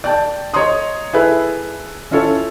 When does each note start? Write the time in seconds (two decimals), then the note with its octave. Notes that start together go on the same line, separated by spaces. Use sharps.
0.04 D5 G5 A5
0.54 C#5 D#5 A#5 C6 D#6
1.13 E4 G#4 A4 B4 E5
2.11 C#4 E4 F4 A4 C#5